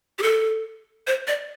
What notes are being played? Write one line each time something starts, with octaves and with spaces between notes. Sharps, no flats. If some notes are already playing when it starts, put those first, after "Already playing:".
G4
A4
C5
D5